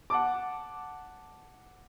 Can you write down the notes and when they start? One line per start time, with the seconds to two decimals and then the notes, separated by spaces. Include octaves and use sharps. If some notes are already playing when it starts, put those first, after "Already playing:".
0.10 F#5 A5 D6